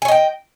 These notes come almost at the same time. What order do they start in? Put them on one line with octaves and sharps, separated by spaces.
G#5 C#5 D#5 G5